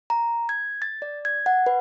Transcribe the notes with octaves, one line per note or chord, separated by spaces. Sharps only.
A#5
G#6
A6
D5
G#6
F#5
B4